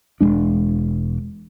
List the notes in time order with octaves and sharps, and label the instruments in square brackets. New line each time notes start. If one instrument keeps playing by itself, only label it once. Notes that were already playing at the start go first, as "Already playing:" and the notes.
[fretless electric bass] E1 E2 G#3 D4